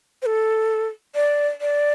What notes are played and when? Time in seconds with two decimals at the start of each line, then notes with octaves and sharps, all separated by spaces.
0.22 C5
0.26 A4
1.15 D5
1.61 D5